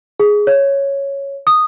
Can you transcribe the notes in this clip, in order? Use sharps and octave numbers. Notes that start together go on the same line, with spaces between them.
G#4
C#5
D#6